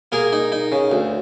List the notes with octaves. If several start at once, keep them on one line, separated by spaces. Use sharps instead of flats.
A#3 G#4 A#4
D#4
D#4
C#3
D2